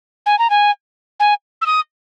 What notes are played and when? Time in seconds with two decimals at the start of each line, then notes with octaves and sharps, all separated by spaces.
0.26 G#5
0.39 A#5
0.50 G#5
1.20 G#5
1.62 E6
1.66 D#6